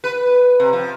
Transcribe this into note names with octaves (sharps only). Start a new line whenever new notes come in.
B4
C3
F3